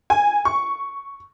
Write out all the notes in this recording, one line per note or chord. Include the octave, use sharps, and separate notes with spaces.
G#5
C#6